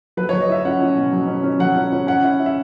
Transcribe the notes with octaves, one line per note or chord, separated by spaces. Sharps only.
F#3 B4
C#5
F#3
D#5
E4 E5
C#4 F#5
C#4
B2
F#3
C#4
C#4
F#3 F#5
C#4
C#4
C#4 F#5
E4
E4
E5